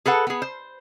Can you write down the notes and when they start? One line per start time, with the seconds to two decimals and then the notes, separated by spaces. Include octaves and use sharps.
0.06 G#4 A4 B4 F#5
0.27 B3 G#4
0.42 C5